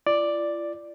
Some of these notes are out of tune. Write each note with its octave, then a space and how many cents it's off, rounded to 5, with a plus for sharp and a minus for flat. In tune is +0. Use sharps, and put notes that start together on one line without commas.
F4 -40 D5 +0